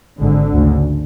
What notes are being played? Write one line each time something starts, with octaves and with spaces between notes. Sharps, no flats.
G#1 G#2 D3
D2 C#3